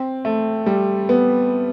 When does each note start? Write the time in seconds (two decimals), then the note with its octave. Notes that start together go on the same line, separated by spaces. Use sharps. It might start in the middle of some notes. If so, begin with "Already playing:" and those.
Already playing: C4
0.25 A3
0.66 G3
1.09 B3